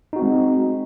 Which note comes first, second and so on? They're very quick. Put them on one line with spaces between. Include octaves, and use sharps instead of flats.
D#4 F#4 C4 G#3